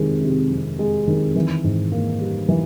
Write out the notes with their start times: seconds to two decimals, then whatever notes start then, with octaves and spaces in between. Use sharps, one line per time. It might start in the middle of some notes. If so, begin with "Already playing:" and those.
Already playing: F2 C3 D#3 G#3
0.22 C3
0.51 F2
0.79 G#3
1.07 D#3
1.36 E3
1.64 G#2
1.92 A#3
2.21 G3
2.48 E3